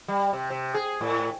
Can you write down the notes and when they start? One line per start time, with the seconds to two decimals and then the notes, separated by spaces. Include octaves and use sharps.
0.08 G3
0.33 C3
0.50 C3
0.74 G#4
1.01 A2